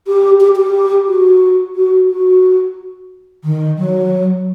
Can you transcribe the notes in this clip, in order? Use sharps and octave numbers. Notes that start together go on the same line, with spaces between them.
G4
G4
G4
F#4
F#4
F#4
D#3
F#3